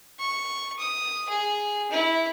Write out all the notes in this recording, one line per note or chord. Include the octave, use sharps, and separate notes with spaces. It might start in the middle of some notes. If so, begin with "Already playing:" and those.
C#6
D#6
G#4
E4